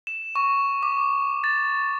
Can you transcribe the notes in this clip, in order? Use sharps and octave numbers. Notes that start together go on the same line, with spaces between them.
E7
C#6
D6
A6